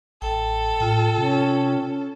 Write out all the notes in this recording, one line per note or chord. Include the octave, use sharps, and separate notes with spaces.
A1 A4 G5
A2 F4 G5
C3 C#4
C#4